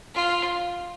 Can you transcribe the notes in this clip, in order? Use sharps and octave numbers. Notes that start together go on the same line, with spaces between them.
F4